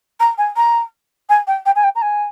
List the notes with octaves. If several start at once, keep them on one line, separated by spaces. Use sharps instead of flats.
A#5
G#5
A#5
G#5
G5
G5
G#5
G5
A#5
G#5